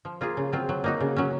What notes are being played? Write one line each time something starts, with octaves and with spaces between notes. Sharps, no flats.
F3
A#3 F4 G#4
C#3
F#3 C4 F4
F#3
A#3 D#4 F#4
C#3
F#3 C#4